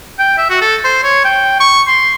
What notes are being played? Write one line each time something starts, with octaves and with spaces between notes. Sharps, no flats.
G5
E5
F#4
A4
C5
C#5
G5
C#6
C6